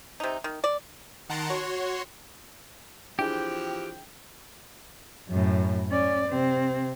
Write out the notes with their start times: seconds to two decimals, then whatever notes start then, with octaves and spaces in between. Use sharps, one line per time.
0.20 C3 D#4
0.44 D#3
0.64 D5
1.29 D#3 F#5 A5 A#5 C6 D7
1.50 F#4 C#5 C6
3.19 E3 F3 C4 D4 E4 G4 G#4 G5
5.29 F#2 A2
5.90 C#4 D5
6.28 C3 C4